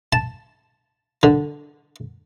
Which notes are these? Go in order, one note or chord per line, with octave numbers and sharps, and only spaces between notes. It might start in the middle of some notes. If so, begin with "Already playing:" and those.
A5
D3